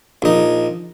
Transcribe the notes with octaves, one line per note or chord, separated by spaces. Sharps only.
A#1 D#4